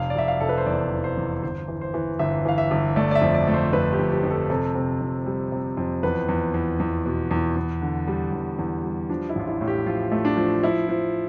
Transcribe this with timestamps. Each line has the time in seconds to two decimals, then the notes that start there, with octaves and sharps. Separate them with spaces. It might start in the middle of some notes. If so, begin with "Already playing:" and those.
Already playing: F1 F5
0.10 D5
0.15 F1 E5
0.28 F5
0.41 F1 A4
0.49 B4
0.58 C5
0.66 E2 D5
0.91 E2
1.04 C5
1.17 E2
1.43 G1 C5
1.68 E3
1.81 C5
1.94 E3
2.19 G1 E5
2.45 E3 F5
2.58 E5
2.71 G1
2.96 A3 D5
3.11 D5
3.15 E5
3.22 F2
3.35 D5
3.48 A3
3.54 C5
3.73 F2 B4
3.92 G4
3.99 F2
4.12 G4
4.24 F2
4.31 A4
4.50 C3 A4
4.75 C3
5.01 F2
5.26 G3
5.52 C3
5.77 F2
6.03 E2 B4
6.29 E2
6.54 E2
6.80 E2
7.06 B2
7.31 E2
7.56 E2
7.82 D3
8.07 G3
8.33 E2
8.59 E2
8.84 G3
9.10 F3 D4
9.29 E4
9.35 A1 F4
9.48 E4
9.61 A2
9.68 G4
9.86 F3 F4
10.12 A3
10.25 D4
10.37 F3
10.63 F3 E4
10.89 F3